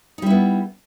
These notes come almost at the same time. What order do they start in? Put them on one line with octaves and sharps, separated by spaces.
D#4 G3 E4 B3